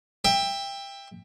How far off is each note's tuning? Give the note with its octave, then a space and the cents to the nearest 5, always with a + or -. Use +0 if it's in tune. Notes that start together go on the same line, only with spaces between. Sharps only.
E5 +0 G5 +20